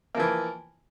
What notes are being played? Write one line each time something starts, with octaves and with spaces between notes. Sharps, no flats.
E3 F3 A#3